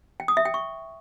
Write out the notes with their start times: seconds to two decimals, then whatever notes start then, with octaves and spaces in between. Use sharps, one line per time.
0.20 G5
0.28 D#6
0.37 E5
0.45 G5
0.54 C#6